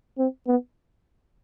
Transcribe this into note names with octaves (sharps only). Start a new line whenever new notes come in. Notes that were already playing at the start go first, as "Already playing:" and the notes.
C4
B3